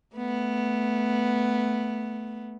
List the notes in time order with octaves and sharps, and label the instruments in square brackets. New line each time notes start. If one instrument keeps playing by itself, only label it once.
[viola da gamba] A3 B3